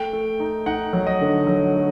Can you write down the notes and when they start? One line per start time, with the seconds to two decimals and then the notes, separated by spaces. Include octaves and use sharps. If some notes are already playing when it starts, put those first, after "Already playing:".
Already playing: A3 G5
0.13 A3
0.40 D#4
0.66 D#4 F#5
0.93 F#3
1.07 D#5
1.21 D3
1.47 F#3
1.75 A3